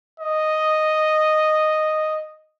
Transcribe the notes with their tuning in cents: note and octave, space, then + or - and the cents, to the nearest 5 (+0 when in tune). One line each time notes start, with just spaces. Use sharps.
D#5 -5